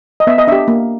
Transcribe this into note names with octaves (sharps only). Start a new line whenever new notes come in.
D#5
B3 E5
D#5
D4 G4 E5
A#3